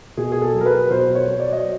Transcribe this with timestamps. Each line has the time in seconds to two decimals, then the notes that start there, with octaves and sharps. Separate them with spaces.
0.17 B2 G#4
0.32 G#4
0.42 A4
0.54 F#3
0.61 A#4
0.66 B4
0.90 B2 C5
1.15 C#5
1.27 F#3
1.40 D5
1.52 D#5